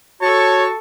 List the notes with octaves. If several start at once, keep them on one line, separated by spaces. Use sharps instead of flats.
F#4 A4 C#5 A5 C#6